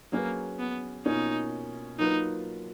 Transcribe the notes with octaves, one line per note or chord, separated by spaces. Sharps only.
F#3 A#3 C#4 G#4 B4
B3
B2 A#3 C#4 D#4 F4
F#3 A#3 D#4 F4 B4